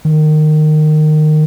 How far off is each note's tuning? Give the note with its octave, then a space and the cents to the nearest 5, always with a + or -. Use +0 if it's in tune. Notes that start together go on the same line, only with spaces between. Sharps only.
D#3 -20